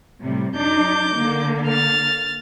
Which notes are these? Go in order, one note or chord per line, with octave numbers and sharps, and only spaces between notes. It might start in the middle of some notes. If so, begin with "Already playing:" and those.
A2 C3 G3
F#2 D4 D#4 D6 G6
D3 A#3
F6 A6